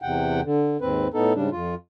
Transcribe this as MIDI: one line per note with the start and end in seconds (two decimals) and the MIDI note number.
0.02 0.41 40
0.02 0.41 48
0.02 0.41 78
0.02 0.41 79
0.44 0.77 50
0.81 1.08 39
0.81 1.08 44
0.81 1.08 60
0.81 1.08 71
1.14 1.33 45
1.14 1.33 59
1.14 1.33 63
1.14 1.33 69
1.35 1.50 44
1.35 1.50 49
1.35 1.50 55
1.35 1.50 62
1.52 1.75 41
1.52 1.75 65